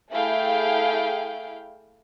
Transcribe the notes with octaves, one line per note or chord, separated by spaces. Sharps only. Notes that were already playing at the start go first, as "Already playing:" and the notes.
A3 E4 G#4 F5 G5